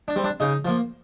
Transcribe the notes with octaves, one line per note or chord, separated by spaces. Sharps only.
D4
G3 C4
D4
C#3 D#4
F3 A#3